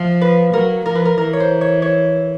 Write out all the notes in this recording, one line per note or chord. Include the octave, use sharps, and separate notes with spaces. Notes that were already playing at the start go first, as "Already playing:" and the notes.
Already playing: F3 F5
B4
F#3 A#4
F3 A#4
B4
A#4
E3 A#4
C#5
C5
C#5
C#5